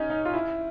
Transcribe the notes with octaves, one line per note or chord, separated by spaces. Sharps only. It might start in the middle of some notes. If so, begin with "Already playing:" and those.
Already playing: C#4 D#4
D#4
F4
E4